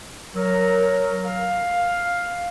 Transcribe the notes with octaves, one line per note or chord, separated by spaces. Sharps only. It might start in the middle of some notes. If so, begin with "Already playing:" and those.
F#3 A#4
F5